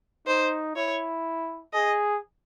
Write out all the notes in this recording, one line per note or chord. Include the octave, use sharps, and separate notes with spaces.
D#4 C5
E4 C#5
G#4 D#5